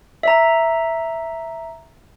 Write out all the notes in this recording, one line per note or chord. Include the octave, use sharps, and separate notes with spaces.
E5 A#5